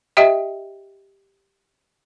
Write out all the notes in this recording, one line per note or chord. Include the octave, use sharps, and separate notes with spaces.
G4 D#5 E5 G5